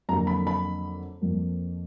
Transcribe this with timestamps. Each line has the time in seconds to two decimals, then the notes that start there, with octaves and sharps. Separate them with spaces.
0.09 F2 D3 F#3 A#3 A#5
0.27 B5
0.47 B5
1.21 F2 F3 A#3